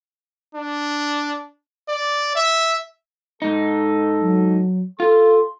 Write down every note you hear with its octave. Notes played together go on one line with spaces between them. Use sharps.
D4
D5
E5
G#2 D#4 A4
F#3
F4 A4 C6